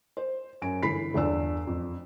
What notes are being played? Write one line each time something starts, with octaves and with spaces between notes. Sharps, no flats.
C5
F#2 G#5 D7
G1 E3 B5 B6 C7
G1 E2 D4 E6
F2